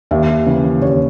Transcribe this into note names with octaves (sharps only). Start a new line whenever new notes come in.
D#2 E5
C#3 E3
D#2 C#5